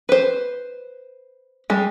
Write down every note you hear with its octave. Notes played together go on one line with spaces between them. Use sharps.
B4 C5
G3 G#3